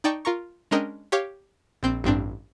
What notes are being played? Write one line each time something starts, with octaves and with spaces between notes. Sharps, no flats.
D#4 D5 G5 A5 C#6
F4 A#4 A#5 C#6
G#3 C#4 D4 A#4 D#5 G5
G4 C#5 F5 D6
A#1 C4 G6
A1 G2 C4 D4